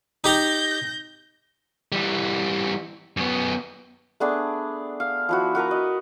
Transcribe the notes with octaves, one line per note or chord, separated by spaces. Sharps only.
D#4 G4 A#5 G6 A#6
E3 G3
F#2 B3
A3 B3 D4 G#4
F5
F3 E4 F#4
F#4 A#4 B4 A#5
D#5